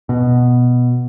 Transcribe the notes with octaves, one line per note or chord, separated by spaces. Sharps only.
B2